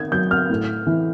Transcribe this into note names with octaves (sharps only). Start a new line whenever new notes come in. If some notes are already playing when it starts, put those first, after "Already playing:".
Already playing: D#3 G#6
F#3 G6
F6
A2
E3